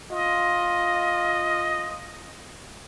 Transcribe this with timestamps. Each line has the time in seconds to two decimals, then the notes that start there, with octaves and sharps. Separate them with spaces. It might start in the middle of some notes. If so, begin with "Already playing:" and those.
0.11 F4 D#5